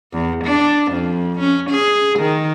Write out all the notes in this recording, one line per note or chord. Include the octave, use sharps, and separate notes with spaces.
E2
D4
F2
C#4
G#4
D#3